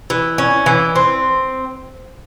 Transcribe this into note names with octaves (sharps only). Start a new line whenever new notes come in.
E3
C#4
E3
C4